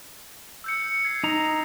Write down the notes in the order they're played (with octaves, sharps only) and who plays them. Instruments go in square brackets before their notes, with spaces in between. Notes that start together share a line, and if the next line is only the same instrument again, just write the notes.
[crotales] E6 G6 C#7
G#6 C7 C#7
[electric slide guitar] D#4 A#5